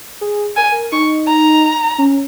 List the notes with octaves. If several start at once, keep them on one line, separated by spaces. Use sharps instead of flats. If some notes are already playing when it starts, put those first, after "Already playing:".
G#4
A#4 G#5
A#4
D#4 C#6
A#5
C#4